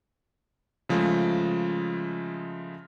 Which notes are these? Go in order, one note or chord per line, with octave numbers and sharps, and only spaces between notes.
C#3 F3 G#3 A3